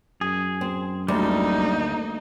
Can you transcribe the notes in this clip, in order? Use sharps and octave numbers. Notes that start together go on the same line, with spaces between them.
F#2 G#4
C4
D2 D3 G3 A#3 D#4